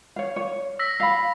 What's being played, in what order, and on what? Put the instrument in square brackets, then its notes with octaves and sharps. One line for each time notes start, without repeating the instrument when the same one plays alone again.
[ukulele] C#5 F5
C#5
[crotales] E6 A#6 B6
[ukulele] F5 B5